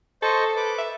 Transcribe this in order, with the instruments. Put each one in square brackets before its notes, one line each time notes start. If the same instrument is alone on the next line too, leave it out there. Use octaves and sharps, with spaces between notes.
[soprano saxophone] A4 [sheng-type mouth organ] C5 D#5 C#6
[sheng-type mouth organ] B4 D6
[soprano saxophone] E5